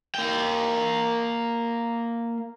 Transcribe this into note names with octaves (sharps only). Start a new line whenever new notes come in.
A#3 G5